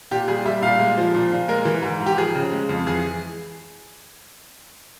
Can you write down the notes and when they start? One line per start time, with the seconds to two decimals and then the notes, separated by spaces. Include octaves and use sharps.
0.11 A#2 G4
0.28 G3 G#4
0.46 G3 E5
0.62 A#2 F5
0.79 G#3
0.98 F3
1.14 A#2
1.32 A#2
1.48 G#3 A#4
1.65 E3
1.82 G#2
2.00 G#2
2.06 G4
2.17 F3 G#4
2.35 C#3
2.52 G#3
2.69 F2
2.86 E3 G#4